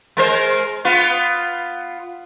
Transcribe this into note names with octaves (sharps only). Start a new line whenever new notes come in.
G#3 A#4 C5
B3 F4